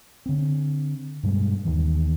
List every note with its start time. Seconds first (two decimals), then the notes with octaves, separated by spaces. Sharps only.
0.26 D3 C4
1.23 G2 B2 G3 G#3
1.65 D#2 D#3 E3